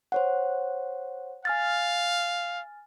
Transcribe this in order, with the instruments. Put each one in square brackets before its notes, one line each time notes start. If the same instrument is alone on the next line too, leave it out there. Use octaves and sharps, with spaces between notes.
[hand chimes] C5 C#5 F#5
[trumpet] F5 [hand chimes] G#5 F6 A6